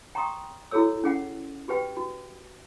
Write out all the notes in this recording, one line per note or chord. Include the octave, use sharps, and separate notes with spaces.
G5 A#5 C6 C#6 D#6
E4 F#4 G#4 A4 C#5 E6
C#4 G#4 F#5
F#4 G4 B4 G5
F#4